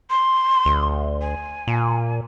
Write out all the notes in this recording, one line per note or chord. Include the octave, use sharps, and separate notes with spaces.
C6
D2
G#5
A#2